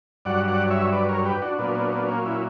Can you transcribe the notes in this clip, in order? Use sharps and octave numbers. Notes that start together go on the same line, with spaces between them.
G2 F#3 D5 F#5
D5 F#5
C#5 E5
B4 D5
A#4 C#5
G4 B4
D4 F#4
A#2 F#3 B3 D4
B3 D4
B3 D4
A#3 C#4
C#4 E4